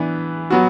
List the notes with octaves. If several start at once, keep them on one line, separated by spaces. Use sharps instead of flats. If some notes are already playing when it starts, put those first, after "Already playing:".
Already playing: E3 B3 D4
F#3 B3 F#4